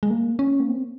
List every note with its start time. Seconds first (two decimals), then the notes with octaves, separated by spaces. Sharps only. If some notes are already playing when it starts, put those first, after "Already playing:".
0.03 G#3
0.10 A#3
0.39 C#4
0.60 A#3
0.68 C4